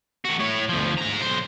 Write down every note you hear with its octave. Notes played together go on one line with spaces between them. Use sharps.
D#3 F#4
A2 C#5
D2 F3
G#2 A#5
B1 C5